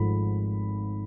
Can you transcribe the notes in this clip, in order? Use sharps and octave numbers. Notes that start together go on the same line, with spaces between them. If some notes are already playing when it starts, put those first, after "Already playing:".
Already playing: G#1 G#2 F3 A3 B5